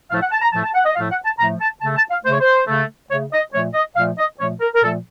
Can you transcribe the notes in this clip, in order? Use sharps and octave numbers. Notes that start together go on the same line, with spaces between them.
A2 F3 A3 F5
F#5
A5
A#5
A2 F3 A3 A5
A5
F#5
D#5
A2 F3 A3 F5
F#5
A5
A2 F3 A3 A#5
A5
C#3 A3 A5
A5
F5
C#3 A3 C5
C#5
C5
C#3 A3
C#3 A3 C#5
D#5
A#2 F3 A3 C#5
D#5
A#2 F3 A3 F5
D#5
A#2 F3 A3 C#5
A#4
A#4
A#2 F3 A3 A4